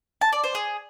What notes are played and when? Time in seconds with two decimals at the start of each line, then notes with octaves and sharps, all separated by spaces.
0.21 A5
0.33 D5
0.44 C5
0.55 G#4